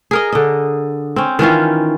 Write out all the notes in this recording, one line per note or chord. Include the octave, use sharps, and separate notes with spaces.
G#4 A#4 D#5
D3 D#5
C4 C#4
D#3 E3 C#4 F4